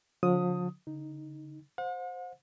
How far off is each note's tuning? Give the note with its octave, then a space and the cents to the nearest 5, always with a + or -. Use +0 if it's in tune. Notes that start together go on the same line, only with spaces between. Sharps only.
D3 -35 F3 +40 D#6 +10
D3 -40 D#4 +0
C5 +0 F#5 -45